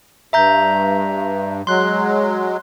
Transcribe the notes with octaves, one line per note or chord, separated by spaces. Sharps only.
G2 E5 A#5 G6
F#3 G#3 C6 F#6